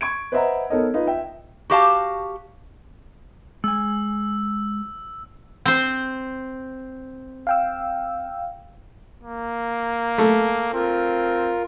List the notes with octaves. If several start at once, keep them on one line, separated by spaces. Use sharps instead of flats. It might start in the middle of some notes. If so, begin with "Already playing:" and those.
C#6 G#6 D7
B4 C5 D#5 E5 F#5 A#5
B3 D#4 A4 A#4 C#5 D#5
D#4 F4 B4 D#5
E5 G5
F#4 G4 F5 A5
G#3 G#5 E6
C4 C5
F5 G5 E6
A#3
A3
C4 F4 A#4